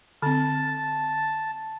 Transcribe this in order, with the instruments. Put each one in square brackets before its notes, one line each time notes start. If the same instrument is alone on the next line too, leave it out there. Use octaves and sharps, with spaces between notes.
[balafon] D3 C4 [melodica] A5